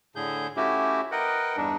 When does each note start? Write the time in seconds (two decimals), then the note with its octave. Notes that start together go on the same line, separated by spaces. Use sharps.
0.16 A2 D3 G#4 G6
0.57 A3 C#4 E4 F#4 G4
1.12 A#4 B4 D#5 F#5 G5
1.56 E2 G2 G3 D4 D#4